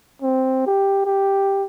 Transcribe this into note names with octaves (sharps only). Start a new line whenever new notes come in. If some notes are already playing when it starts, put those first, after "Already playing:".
C4
G4
G4